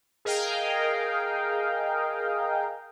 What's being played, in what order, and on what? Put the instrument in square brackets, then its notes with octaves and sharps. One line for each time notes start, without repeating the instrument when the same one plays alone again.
[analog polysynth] G#4 A#4 D#5 F5 G5